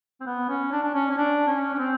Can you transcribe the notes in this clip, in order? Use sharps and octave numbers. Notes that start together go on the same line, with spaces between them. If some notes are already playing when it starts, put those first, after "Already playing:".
C4
B3
C#4
D4
D4
C#4
C#4
D4
C#4
C#4
C4